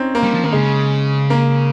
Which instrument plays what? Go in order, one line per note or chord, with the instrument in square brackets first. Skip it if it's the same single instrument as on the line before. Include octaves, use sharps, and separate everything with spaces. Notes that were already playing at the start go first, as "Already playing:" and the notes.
Already playing: [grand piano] C4 C#4 D#4
A#3
[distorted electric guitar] G3
F3
[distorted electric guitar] D#3 [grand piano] A#3
[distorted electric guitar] C#3 [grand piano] G#3
[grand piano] A#3